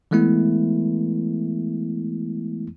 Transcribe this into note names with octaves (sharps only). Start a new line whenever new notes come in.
E3 G#3 A3 B3 E4